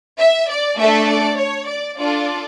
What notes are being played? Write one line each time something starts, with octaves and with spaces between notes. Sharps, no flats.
E5
D5
A3 D4 A4 E5
D5
C#5
D5
D4 F4 A4 D5